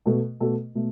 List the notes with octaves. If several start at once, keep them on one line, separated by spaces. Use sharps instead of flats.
B2 A3 F#4 A4
B2 A3 F#4 A4
B2 A3